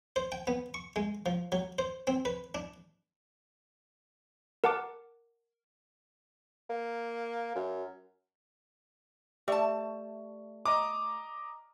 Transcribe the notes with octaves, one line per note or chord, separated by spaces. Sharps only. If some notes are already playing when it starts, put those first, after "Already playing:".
C5
G5
B3
C#6
G#3
F3
F#3
C5
C4
B4
D4
A#4 F#5 A5 D6
A#3
F#2
A3 G4 D5 E5 A5
D#5 A#5 D6